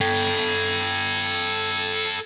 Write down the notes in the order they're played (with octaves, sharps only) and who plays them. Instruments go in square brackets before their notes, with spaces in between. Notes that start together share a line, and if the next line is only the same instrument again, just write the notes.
[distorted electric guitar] A4 G5